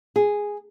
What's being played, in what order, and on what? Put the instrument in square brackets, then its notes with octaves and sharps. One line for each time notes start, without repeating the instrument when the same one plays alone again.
[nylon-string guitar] G#4